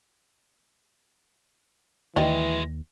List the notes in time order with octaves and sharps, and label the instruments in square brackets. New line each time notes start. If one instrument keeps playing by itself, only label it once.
[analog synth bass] D#2 [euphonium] E3 [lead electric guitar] F#3 G#3 [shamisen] D5 D#5 G5